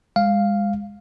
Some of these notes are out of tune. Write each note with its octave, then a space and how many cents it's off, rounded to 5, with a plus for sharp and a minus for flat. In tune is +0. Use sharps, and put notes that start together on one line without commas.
G#3 -30 F5 +0